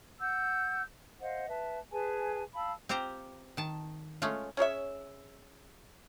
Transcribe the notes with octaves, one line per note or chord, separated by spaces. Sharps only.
F#5 E6 G6
C5 D#5 F5 F#5
B4 E5 A5
G#4 B4 G#5 A5
F5 A5 B5 E6
C4 F4 G4 C5 A#5
D#3 A5
G#3 A3 C#4 F4
C#4 G#4 C#5 E5